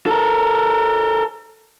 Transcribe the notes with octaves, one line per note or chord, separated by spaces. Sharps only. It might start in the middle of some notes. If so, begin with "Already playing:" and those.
A4 A#4